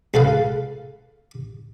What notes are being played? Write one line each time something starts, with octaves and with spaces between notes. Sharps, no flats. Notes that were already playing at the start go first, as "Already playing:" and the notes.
C#2 A4 B4 F5